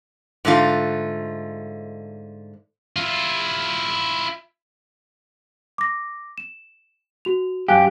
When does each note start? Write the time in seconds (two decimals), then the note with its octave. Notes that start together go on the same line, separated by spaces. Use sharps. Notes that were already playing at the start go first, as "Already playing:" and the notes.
0.45 G#2 D3 A3 F4
2.96 E4 F4
5.78 D6 A#6
6.38 E7
7.25 F#4 F7
7.68 F#2 G4 F5 G#5 F#6